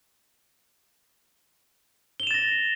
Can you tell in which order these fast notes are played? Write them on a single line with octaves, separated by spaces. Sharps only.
G7 F7 E7 A6 A#6